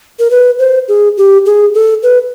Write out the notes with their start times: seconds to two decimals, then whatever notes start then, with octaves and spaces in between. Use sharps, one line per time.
0.19 A#4
0.31 B4
0.59 C5
0.88 G#4
1.17 G4
1.46 G#4
1.74 A4
2.03 B4